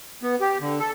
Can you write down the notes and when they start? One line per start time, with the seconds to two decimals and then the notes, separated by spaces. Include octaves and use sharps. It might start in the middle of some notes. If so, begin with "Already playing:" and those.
0.23 B3
0.41 G4
0.60 D3
0.80 A4